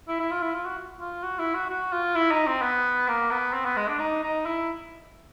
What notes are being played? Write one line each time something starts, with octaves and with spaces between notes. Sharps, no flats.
E4
E4
F4
E4
F4
F#4
F4
F#4
E4
F#4
F#4
F4
E4
D#4
C4
B3
A#3
B3
C4
B3
G#3
D4
D#4
D#4
E4